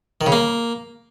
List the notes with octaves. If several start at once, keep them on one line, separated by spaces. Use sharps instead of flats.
D#3
C#3
A#3